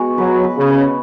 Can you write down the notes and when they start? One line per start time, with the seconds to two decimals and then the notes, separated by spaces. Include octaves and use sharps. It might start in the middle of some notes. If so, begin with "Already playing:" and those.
Already playing: G#3 B3 F#4
0.18 F#3 B4
0.44 B4
0.57 C#3
0.70 B4